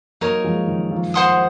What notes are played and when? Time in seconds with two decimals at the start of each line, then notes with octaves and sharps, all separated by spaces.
0.21 F#3 A#3 D#4 A#4 C#5
0.44 F3 G#3
0.67 D#3
0.91 F3
1.14 C5 F#5 C6 D#6